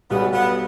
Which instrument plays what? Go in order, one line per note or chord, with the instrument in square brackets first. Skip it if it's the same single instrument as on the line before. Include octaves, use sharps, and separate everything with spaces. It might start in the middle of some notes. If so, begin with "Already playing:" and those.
[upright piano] B1 B2 G3 [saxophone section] B3
[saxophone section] B3